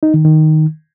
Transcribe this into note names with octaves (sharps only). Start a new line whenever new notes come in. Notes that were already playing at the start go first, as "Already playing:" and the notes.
D#4
D#3
D#3